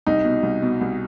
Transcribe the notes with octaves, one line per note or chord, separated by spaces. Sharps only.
C2 D#4
B2
C2
B2
C2